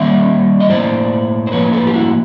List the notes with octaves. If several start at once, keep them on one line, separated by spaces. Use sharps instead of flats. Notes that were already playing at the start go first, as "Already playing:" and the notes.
Already playing: D#3 G3 A#3 D5 E5
D#5
A2 F3 A#3 C5 D5
C5
A2 F3 A#3 B4 C#5
A4 B4
G4
E4 F#4